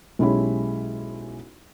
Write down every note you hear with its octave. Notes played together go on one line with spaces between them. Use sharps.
B1 G#3 C#4 E4 G4 B5